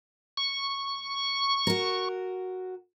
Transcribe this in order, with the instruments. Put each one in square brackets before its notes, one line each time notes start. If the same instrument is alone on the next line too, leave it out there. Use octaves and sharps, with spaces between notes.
[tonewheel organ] C#6
[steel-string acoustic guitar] F#4 A#4